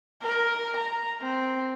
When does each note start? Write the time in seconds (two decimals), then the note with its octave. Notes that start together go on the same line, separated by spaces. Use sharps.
0.22 A#4
0.76 A#5
1.22 C4